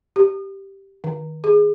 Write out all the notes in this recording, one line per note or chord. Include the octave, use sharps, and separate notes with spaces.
G4
D#3
G#4